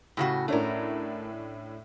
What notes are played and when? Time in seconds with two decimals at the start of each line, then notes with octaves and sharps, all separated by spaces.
0.17 A2 C#3 F#4 G4
0.48 A2 A3 C#4 D4 A#4